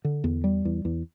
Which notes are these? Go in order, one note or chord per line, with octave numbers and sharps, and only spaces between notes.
D3
E2
G3
E2
E2